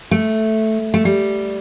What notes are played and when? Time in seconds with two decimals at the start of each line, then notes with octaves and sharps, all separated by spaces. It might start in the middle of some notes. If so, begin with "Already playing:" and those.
0.11 A3
0.94 A3
1.05 G3